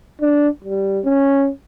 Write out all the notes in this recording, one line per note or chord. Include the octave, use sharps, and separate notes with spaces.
D4
G3
C#4